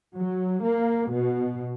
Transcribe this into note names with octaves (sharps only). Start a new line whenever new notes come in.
F#3
A#3
B2